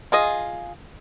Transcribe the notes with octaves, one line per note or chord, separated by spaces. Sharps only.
F4 G#4 D#5